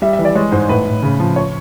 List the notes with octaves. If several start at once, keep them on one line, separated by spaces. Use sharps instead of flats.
G3 E5
E5
E3
D5
G#3 C#5
G#2 C5
A2 B4
A2
C#3
F3
C#5